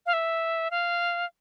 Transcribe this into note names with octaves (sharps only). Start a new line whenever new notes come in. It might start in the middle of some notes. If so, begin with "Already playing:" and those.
F5
E5
F5